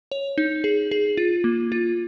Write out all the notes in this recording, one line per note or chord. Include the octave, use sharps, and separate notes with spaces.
C#5
D#4
G#4
G#4
F4
A#3
F4